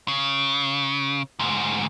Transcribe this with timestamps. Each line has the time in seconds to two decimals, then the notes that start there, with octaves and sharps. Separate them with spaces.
0.08 C#3
1.39 D2 G#2